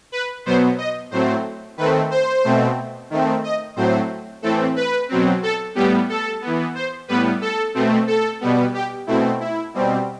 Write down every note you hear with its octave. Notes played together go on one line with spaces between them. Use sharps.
B4
B2 F#3 B3 C5
D#5
A2 F#3 A3 C4 C5
D#3 A3 C4 B4
C5
B2 A3 C4
D#3 A3 C4
D#5
A2 F#3 A3 C4 C5
A2 E3 A3 C4 A4
B4
B2 F#3 C4
A4
A2 G3 B3 G4
A4
E3 B3
C5
A2 G3 B3 B4
A4
B2 A3 C4
A4
B2 G3 B3
G4
B2 A3 C4 E4
E4
B2 G3 C4